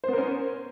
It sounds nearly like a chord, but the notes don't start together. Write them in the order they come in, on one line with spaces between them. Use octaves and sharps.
C5 B3 A#4 C#4